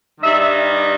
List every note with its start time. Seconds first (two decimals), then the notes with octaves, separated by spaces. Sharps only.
0.21 G2 D#3 G3 D#4 E5